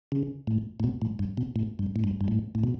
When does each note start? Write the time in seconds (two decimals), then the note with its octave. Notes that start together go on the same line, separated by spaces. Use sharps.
0.12 C#3
0.47 A2
0.80 A2
0.84 B2
1.02 A2
1.19 G2
1.37 B2
1.56 A2
1.79 G2
1.96 A2
2.04 G2
2.21 G2
2.28 A2
2.55 A2
2.64 B2